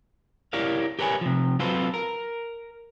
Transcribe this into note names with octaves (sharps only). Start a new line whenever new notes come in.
E4 G4 A#4 C#5 D5 F5
G4 A#4 B4 C#5 F#5 G#5
C3 F3
F#3 C4 F4 A4 B4 C5
A#4